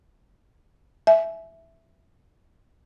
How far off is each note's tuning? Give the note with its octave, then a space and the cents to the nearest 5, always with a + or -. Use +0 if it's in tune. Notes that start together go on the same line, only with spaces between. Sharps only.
E5 +0 G#5 +30